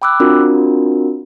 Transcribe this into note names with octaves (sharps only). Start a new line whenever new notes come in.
G5 B5 D6 E6 F#6
C4 D4 F4 F#4 A#4